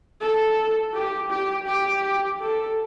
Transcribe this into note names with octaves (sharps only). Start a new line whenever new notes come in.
A4
G4
G4
G4
A4